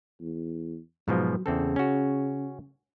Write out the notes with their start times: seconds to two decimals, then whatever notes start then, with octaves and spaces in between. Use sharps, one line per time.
0.21 E2
1.08 G#2 B2 F3 F#3
1.46 E2 C#3 C4 A4
1.76 C#4 F#4